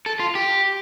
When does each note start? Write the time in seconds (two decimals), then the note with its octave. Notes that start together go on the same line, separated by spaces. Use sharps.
0.06 A4
0.20 F4
0.35 G4